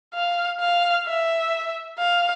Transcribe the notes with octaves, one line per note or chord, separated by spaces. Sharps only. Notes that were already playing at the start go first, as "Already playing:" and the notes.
F5
F5
E5
F5